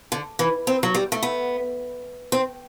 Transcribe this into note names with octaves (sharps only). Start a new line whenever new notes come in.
D3
E3
C4
F#3
G3
A3
B3
C4